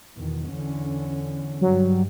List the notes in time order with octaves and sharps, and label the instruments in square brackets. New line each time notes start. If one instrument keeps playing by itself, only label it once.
[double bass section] E2 B2 D#3
E2 D3 C#4
[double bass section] G2 G3 [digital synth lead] F#3